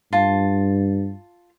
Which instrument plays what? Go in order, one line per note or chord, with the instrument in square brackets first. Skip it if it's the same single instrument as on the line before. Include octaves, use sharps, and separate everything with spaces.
[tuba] G2 [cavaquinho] F4 A5